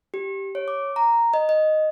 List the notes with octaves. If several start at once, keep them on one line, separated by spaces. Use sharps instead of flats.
G4
C#5
D6
A#5
D#5
D#5